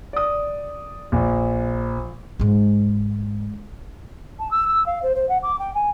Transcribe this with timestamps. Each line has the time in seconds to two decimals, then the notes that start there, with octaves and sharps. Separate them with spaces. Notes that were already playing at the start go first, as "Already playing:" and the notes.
0.13 D5 D#6
1.12 A#1
2.40 G#2 G#3
4.39 A5
4.51 E6
4.68 E6
4.86 F5
5.02 C5
5.15 C5
5.28 F#5
5.42 D6
5.59 G5
5.74 G#5